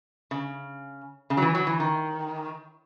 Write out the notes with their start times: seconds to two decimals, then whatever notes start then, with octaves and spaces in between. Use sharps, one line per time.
0.31 C#3
1.30 C#3
1.37 F#3
1.42 E3
1.55 F#3
1.67 E3
1.80 D#3